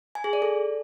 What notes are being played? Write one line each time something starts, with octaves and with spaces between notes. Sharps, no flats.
G#5
G#4
D5
A4